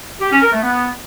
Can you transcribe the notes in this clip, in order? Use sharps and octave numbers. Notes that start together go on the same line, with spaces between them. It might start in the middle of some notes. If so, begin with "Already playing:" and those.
G4
C#4
A#4
A3
B3